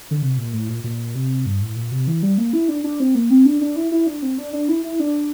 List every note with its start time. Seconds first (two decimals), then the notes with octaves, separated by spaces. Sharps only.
0.11 D3
0.22 C3
0.38 A#2
0.53 A2
0.69 A#2
0.84 A#2
1.15 C3
1.46 G2
1.62 A2
1.76 A#2
1.92 C3
2.07 E3
2.23 G3
2.38 A#3
2.53 E4
2.69 D4
2.84 D4
3.00 C4
3.15 A#3
3.30 C4
3.46 D4
3.61 D4
3.76 E4
3.92 E4
4.07 D4
4.22 C4
4.38 D4
4.53 D4
4.68 E4
4.84 E4
5.00 D4